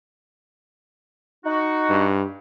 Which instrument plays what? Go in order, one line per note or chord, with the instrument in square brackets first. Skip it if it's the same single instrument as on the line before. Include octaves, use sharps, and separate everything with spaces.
[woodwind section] D#4 F#4
[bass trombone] G2